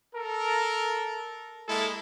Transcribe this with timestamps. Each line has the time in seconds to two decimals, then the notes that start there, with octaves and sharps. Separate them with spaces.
0.15 A4 A#4
1.68 G#3 A#3 E4 A4